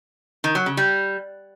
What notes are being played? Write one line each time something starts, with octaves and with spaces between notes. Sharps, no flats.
D#3
F#3
C#3
G3